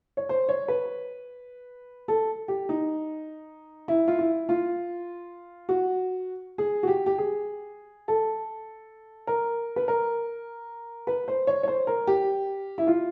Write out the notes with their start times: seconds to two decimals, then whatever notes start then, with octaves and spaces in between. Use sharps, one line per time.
0.17 C#5
0.29 C5
0.49 C#5
0.68 B4
2.08 A4
2.48 G4
2.69 D#4
3.88 E4
4.08 F4
4.19 E4
4.49 F4
5.69 F#4
6.58 G#4
6.83 F#4
6.88 G4
7.06 G4
7.18 G#4
8.08 A4
9.27 A#4
9.76 B4
9.88 A#4
11.07 B4
11.28 C5
11.47 C#5
11.63 C#5
11.68 C5
11.87 A#4
12.07 G4
12.78 E4
12.87 F4